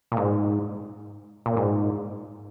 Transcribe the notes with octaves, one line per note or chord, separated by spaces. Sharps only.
A#2
G#2
A#2
G#2